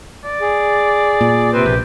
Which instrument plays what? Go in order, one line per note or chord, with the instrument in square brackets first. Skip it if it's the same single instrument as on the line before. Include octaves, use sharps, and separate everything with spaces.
[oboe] D5
[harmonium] G#4
[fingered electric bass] A#2
[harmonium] C3 B4 [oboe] C4
[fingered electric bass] A#1 [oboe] G4